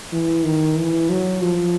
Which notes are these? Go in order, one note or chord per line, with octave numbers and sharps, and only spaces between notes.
E3
D#3
E3
F#3
F3